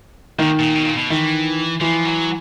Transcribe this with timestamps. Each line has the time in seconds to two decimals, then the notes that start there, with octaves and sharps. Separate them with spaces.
0.39 A#2 D#3
0.59 A#2
0.75 B2
0.86 A#2
0.97 B2
1.10 D#3 E3
1.81 E3 F3
2.05 F#3